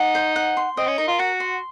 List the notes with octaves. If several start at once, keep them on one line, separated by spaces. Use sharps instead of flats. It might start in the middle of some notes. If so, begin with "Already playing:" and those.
Already playing: D#4 F#5
C5
F#5
C6
C4 D#5
C#4
D#4 A#4
F4
F#4 F#5
C6